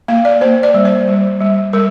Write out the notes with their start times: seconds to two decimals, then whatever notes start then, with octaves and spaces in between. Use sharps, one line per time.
0.08 A#3 F5
0.25 D5
0.41 A#3 C5
0.63 D5
0.74 G3
0.85 C5
1.08 G3
1.40 G3
1.73 G3 A#4